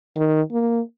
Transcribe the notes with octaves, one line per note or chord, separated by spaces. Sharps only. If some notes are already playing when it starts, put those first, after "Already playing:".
D#3
A#3